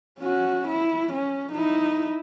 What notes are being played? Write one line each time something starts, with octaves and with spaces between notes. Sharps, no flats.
C#4 F#4
E4
C#4
D#4 E4